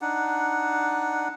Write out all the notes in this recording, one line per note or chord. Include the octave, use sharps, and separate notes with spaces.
D4 D#4 F#5